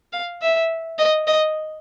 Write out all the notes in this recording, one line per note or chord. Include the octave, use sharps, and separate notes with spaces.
F5
E5
D#5
D#5